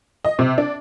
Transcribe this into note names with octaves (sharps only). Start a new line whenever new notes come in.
D#5
C3
D4